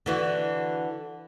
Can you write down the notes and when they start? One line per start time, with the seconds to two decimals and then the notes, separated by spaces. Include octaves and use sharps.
0.06 D3 E3 F#4